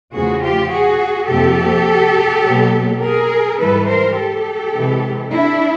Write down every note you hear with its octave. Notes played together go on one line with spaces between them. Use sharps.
E2 C#3 F3 A3 F#4 G#4
F4 G4
F#4 G#4
F2 C3 F3 A#3 G4 A4
B2 F#3 A#3
G#4 A#4
G#2 E3 G3 A4 B4
A#4 C5
G4 A4
C3 E3 G#3
D4 E4